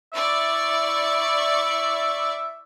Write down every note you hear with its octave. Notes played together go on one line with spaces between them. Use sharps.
E4 D5 E5 C#6